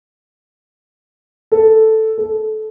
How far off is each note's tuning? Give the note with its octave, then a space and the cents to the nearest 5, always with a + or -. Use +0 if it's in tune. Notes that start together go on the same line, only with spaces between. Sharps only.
A4 +0
A4 -20